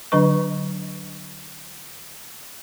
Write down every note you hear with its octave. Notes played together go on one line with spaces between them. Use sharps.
D3 F#3 D4 B4 D#5 C#6